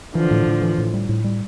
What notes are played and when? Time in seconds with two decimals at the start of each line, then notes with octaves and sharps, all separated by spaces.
0.15 D3 E3 F3
0.31 A2
0.47 A2
0.62 E3
0.78 A2
0.93 G3
1.09 A2
1.24 G3